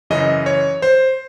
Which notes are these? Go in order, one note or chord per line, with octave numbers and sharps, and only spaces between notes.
F#2 C#3 E3 D#5
C#5
C5